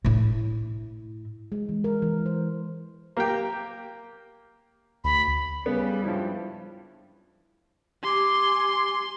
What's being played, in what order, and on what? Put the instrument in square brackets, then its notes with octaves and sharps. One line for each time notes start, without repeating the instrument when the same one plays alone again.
[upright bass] A2 E4
[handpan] G#3
E3
A#4
E3
C5
[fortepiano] A#3 G4 G5
[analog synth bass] D2 [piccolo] B5
[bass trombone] C#3 [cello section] G3 [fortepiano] B3
[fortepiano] G2 E4 [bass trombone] F3
[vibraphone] G4 [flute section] G#5 D6 [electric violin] C6